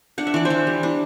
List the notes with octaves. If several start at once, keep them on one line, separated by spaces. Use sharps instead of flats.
D4 F#5
E5
E3 D5
C5 E5
E3
G3
D4